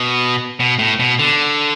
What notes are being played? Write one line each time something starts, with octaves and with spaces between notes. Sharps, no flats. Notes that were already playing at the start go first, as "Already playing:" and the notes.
Already playing: B2
B2
A2
B2
D3